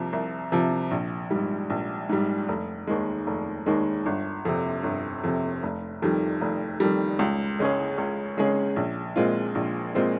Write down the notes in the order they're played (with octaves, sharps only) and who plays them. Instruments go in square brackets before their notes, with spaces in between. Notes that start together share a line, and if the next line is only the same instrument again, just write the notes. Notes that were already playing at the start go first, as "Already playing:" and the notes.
Already playing: [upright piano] C2 C3 F3
C2
C3 F3
A#1
G#2 G3
A#1
G#2 G3
F1
D#2 D#3 G#3
F1
D#2 D#3 G#3
G1
F2 C3
G1
F2 C3
F1
F2 D#3 G3
F1
F2 D#3 G3
C#2
C#3 G#3 C#4 G#4
C#2
C#3 G#3 C#4 G#4
A#1
A#2 G#3 C4 F4
A#1
A#2 G#3 C4 F4